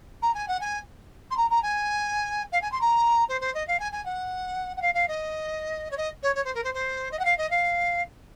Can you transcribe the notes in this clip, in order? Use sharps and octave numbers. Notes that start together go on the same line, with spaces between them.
A#5
G#5
F#5
G#5
C6
A#5
A#5
G#5
F5
G#5
C6
A#5
C5
C5
D#5
F5
G#5
G#5
F#5
F#5
F5
F5
D#5
C#5
D#5
C#5
C#5
C5
A#4
C5
C5
D#5
F#5
F5
D#5
F5